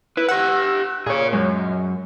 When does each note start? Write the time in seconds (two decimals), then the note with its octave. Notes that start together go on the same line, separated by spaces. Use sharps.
0.17 E4 B4
0.29 G4 F#5 E6 F#6
1.06 A#2 G#4 C#5
1.33 F#2 G#3